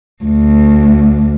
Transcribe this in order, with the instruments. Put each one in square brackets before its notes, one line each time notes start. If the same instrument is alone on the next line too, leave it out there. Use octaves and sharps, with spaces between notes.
[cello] D2